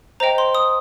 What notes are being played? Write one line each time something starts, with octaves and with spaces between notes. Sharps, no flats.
C5 D#5 G5 A#5
C6
D#6